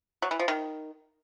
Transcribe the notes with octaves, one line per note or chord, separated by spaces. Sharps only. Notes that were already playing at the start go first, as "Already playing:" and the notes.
F#3
E3
F3
D#3